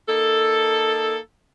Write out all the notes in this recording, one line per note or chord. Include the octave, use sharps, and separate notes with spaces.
A#3 D#4 A4